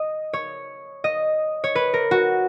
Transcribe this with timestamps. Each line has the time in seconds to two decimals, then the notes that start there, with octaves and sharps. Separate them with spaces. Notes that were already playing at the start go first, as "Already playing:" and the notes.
Already playing: D#5
0.33 C#5
1.04 D#5
1.64 C#5
1.75 B4
1.94 A#4
2.11 F#4